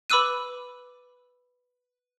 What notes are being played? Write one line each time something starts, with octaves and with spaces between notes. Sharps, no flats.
B4 B5 D6 E6 F#6 D#7